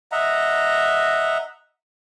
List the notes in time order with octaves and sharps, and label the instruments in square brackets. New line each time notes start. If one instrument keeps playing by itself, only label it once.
[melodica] D#5 E5 F#5 A#5